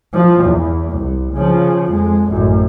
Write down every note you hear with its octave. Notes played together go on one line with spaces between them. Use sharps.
F3
E2
C2
C#3 F3
F2 G#3
A1 F#2